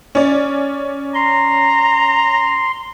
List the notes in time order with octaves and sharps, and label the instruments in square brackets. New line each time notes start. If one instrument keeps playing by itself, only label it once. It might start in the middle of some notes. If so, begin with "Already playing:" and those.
[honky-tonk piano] C#4 D5
[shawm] A#5 [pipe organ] C6